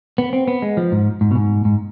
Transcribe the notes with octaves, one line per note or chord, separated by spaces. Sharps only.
B3
C4
B3
G#3
F3
G#2
G#2
B2
G#2
G#2